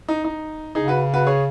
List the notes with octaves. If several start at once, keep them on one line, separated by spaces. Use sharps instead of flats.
D#4
D#4
C#3 D#4 G#4
F#4 B4
F#4 B4
G#4 C#5